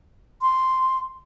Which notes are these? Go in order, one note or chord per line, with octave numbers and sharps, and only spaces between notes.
C6